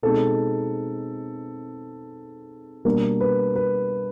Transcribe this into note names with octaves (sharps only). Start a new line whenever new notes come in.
B2 G#3 C4 D#4 A4
B2 G3 A#3 D4 A#4
B4
B4